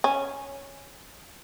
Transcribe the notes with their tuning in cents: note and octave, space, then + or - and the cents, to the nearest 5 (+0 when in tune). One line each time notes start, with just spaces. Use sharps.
C#4 +0